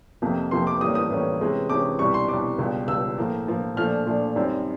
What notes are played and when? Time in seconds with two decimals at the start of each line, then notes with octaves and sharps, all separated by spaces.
0.22 F2 C3 F3 A#3
0.51 F2 C3 F3 A#3 C6
0.67 D6
0.81 A2 E3 G3 A#3 C#4 D#6
0.95 D#6
1.11 A2 E3 G3 A#3 C#4
1.40 C3 E3 G#3 C#4
1.70 C3 E3 G#3 C#4 D6
1.99 C2 B2 G3 C#6
2.14 C6
2.28 C2 B2 G3 D6
2.59 C#2 B2 G3
2.88 C#2 B2 G3 E6
3.18 A2 F3 A#3
3.47 A2 F3 A#3
3.77 A#2 F3 A3 D4 F6
4.06 A#2 F3 A3 D4
4.36 F#2 D#3 G3 C4